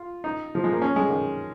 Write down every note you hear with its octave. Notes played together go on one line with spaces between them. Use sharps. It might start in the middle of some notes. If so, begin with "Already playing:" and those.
Already playing: F4
D#4
F3
G#3
A#3
C#4
G#3
D#3